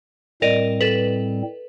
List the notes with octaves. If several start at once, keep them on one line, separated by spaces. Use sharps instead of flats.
A2 G3 C4 A#4 D5 D#5
A4 B4